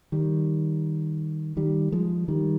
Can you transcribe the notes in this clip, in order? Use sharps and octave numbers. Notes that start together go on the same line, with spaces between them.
D#3 G3
D#3 G3
F3 G#3
D#3 G3